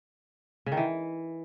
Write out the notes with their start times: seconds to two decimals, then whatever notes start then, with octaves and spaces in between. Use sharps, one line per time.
0.66 C#3
0.72 D#3
0.77 E3